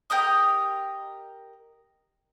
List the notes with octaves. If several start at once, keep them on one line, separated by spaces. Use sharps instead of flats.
G4 A#4 D#5 D#6